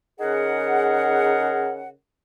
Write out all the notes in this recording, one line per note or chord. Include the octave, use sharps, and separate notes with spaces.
C#3 D#4 G#4 A#4 F#5